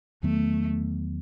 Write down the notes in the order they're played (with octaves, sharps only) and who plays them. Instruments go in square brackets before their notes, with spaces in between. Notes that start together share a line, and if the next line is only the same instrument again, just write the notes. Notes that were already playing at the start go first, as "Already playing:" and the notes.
[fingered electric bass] E2 D#3 F#3 B3 [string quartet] A3